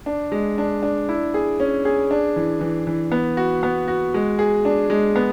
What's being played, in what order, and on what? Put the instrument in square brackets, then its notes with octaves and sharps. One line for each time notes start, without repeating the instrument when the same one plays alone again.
[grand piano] D4
G#3
D4
D4
E4
G#4
C#4
G#4
D4
E3
E3
E3
B3
F#4
B3
F#4
G#3
G#4
D4
G#3
B3